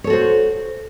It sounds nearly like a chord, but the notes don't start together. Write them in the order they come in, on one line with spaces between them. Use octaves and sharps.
C#5 A4 F#4 C5